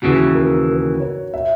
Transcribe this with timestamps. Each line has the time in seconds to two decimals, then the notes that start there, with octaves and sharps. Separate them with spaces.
0.02 D#2 C#3 E3 F#4
0.34 A#4
0.68 A#4
1.00 C#5
1.34 E5